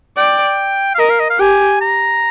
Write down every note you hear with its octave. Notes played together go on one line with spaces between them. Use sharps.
D5 G5
F5
A#4 D#5
F5
D#5
F5
G4 G#5
A#5